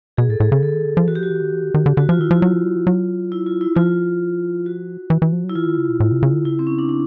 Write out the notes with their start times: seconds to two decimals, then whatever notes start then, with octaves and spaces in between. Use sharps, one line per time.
0.17 B2 G#4
0.29 A2 A4
0.40 A2 G#4
0.52 C#3
0.62 D3 A4
0.74 D#3
0.85 D3
0.97 F3
1.08 E3 F#4
1.15 G4
1.19 F3 F#4
1.30 E3
1.41 D#3
1.53 E3
1.63 D#3
1.74 D#3
1.86 D3
1.97 D3 F#4
2.09 F3 F4
2.19 D#3 E4
2.31 F3 F4
2.42 F#3
2.53 F3
2.64 F#3
2.76 F3
2.87 F#3
3.32 E4
3.46 F4
3.61 E4
3.76 F3 F4
4.66 F#4
5.10 E3
5.22 E3
5.33 F3
5.44 F#3
5.50 E4
5.55 E3 F4
5.66 D#3
5.78 C#3
5.89 B2
6.00 A2
6.12 C3
6.23 C#3
6.33 D3
6.45 C#3 E4
6.59 C4
6.67 C#4
6.79 D4
6.89 D4